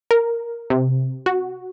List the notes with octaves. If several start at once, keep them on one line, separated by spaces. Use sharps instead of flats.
A#4
C3
F#4